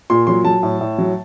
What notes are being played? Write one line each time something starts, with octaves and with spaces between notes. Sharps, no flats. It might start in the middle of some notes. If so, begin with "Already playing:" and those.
A#2 C6
F#3 C6
F#3 A5
A2
A2
F#3